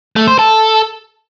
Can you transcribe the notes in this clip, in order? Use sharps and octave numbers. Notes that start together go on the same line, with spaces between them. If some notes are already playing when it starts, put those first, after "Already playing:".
A3
C5
A4